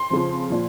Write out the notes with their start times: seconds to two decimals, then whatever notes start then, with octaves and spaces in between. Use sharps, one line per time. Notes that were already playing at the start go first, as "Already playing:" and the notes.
Already playing: C6
0.10 F2 C#3 F3
0.50 A#2 F3